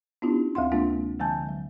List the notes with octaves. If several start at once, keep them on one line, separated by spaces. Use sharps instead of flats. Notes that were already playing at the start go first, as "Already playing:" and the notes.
B3 C#4 D4 E4 F4 G4
D2 F5 F#5 C6
C3 G#3 A#3 D4 F4
D3 F3 G#3 G#5 A5 G6
F#3